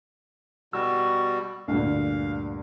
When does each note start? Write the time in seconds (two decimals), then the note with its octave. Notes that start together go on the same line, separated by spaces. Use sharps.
0.73 B2 G3 F#4 E6
1.68 D2 G2 A#2 F5